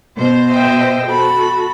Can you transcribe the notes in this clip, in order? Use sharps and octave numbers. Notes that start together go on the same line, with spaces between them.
B2 C5
D#5 E5 G5
F#4 A4 B5